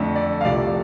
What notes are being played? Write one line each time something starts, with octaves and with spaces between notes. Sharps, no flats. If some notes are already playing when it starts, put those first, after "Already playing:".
Already playing: F2 D3 A3
D5
F5
C2 C3 F3 A3 D5